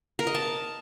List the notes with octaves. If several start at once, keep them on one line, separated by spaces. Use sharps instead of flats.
A#4
D#5
A5